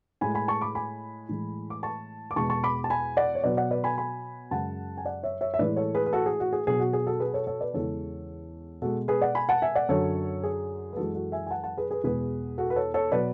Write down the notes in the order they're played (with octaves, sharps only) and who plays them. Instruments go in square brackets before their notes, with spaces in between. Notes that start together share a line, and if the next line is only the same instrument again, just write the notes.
[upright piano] A2 G#3 G#5 B5
G#5 B5
A5 C#6
B5 D6
G#5 B5
A2 E3 G#3
D6
A5 C#6
D6
E2 B2 G#3 A5 C#6
A5 C#6
B5 D6
A5
G#5 B5
D5 F#5
C#5
B2 F#3 B4 D5
D5 F#5
B4 D5
G#5 B5
G#5 B5
F#2 C#3 G#3 F#5 A5
G#5
D5 F#5
C#5 E5
C#5 E5
E5
A2 E3 G#3 B4 D5
A4 C#5
G#4 B4
B4
F#4 A4
G#4
F#4
G#4
B2 F#3 G#4
F#4
G#4
F#4 A4
G#4 B4
A4 C#5
A4 C#5
B4 D5
E2 C#3 E3 G#3 A4 C#5
B2 G#3 F#4 A4
G#4 B4
D5 F#5
G#5 B5
F#5 A5
E5 G#5
D5 F#5
F#2 D3 F#3 A4 C#5
G#4
B4
F#2 E3 G#3 F#4 A4
F#4 A4
E5 G#5
G#5
F#5 A5
F#5 A5
G#4 B4
G#4 B4
E2 B2 G#3 G#4 B4
F#4 A4
B4
A4 C#5
A4 C#5
B2 F#3 B4 D5